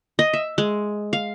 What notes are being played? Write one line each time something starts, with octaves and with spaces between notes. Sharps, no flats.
D#5
E5
G#3
F5